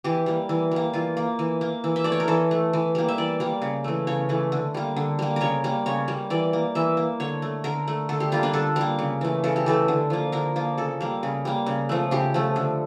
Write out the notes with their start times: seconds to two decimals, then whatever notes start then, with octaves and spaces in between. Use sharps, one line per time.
0.04 E3 G4
0.26 G3 A#3
0.49 E3
0.71 G3 A#3
0.93 E3 F4
1.17 A#3
1.39 E3
1.61 A#3
1.84 E3
1.96 E5
2.04 A3 D5
2.12 C#5
2.20 A#4
2.28 E3 A4
2.51 A3
2.73 E3
2.95 G3 A#3
3.08 E5
3.18 E3 D5
3.40 G3 A#3
3.62 C#3
3.84 E3 A3
4.07 C#3 C#5
4.29 E3 A3
4.52 D3
4.74 G3 A#3
4.96 D3
5.19 G3 A#3
5.36 C#3 A#4 C#5
5.64 G3 A#3
5.86 C#3 C#5
6.08 G3 A#3
6.30 E3 D5
6.53 A#3
6.75 E3 E5
6.97 A#3
7.20 D3 C#5
7.42 A3
7.64 D3 A#4
7.88 A3
8.09 D3 A4
8.20 G4
8.32 G3 A#3 F4
8.43 D4
8.53 D3 A4
8.76 G3 A#3
8.99 C#3
9.21 E3 A3
9.44 C#3 A4
9.56 G4
9.66 E3 A3 A4
9.88 D3
10.10 F3 A#3
10.32 D3 A#4
10.56 F3 A#3
10.78 C#3 A4
11.01 G3 A#3
11.23 C#3
11.45 G3 A#3
11.66 C#3
11.89 F3 A3
12.11 C#3 G4
12.34 F3 A3
12.56 D3